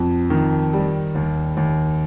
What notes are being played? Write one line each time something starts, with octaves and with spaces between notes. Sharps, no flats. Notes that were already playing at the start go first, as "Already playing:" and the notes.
Already playing: F2
D#3
G3
D#2
D#2